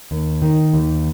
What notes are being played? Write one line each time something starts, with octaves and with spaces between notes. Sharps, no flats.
D#2
D#3
D#2